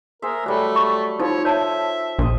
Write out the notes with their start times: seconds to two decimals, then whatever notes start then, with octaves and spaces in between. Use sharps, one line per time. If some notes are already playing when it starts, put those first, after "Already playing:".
0.22 G#4 A#4 C5 E5
0.46 F#3 G3 A3 A4 C5
0.76 C#6
1.20 F3 D#4 C#5
1.45 C#5 E5 A5
2.19 A#1 C5 D#5